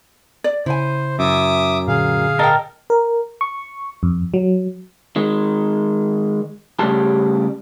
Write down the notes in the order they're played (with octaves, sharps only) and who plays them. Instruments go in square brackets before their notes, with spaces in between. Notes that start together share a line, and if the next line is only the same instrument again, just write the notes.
[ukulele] D5
[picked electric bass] C#3 [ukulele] E4 G#5 [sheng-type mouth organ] C5
[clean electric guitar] F#2 [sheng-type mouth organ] E5 D6 D#6
[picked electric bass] A#2 D3 [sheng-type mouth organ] G#4 F5
[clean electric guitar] A#4 A5 [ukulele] D#5 G5
[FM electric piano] A#4
C#6
F2
F#3
[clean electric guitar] D#3 G#3
C#3 G3 A3 G4 A5